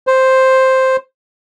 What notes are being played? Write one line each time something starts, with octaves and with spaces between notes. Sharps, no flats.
C5